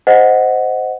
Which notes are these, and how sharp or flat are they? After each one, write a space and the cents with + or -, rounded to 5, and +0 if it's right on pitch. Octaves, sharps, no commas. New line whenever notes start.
C5 -10 D#5 +0 F#5 +0